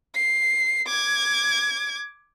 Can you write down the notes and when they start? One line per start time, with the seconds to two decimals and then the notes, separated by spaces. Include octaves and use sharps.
0.15 C7
0.87 D6 G#6